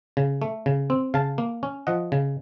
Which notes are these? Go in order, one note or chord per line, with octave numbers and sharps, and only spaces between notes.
C#3
A3
C#3
C4
C#3 F5 A5
A#3
C#4
F3 D#5 F#5
C#3